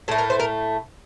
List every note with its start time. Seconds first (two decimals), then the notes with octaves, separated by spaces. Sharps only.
0.08 A2 A4
0.11 A3
0.18 A#4
0.30 C5
0.40 A#4